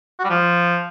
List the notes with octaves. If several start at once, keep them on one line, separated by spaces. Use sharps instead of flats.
F#4
G3
F3